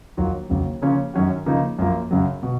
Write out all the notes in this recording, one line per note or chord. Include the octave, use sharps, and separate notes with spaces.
D#2 D#3 F#3 A#3 F4
D#2 C#3 F#3
C#3 F3 A#3 C#4 F4
F#2 D#3 F#3 C#4 F#4
C#3 F3 A#3 D#4
F#2 F3 A#3
F#2 C#3 F#3
B2